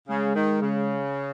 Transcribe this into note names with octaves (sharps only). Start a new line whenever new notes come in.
C#3 G#3
D#3
C#3